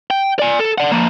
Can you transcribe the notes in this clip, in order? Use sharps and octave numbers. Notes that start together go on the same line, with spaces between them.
G5
D5 G#5
A4
D5 F#5
F3 A#3